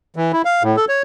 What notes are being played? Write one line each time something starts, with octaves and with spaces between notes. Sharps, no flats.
E3
E4
F5
A2
A4
C#5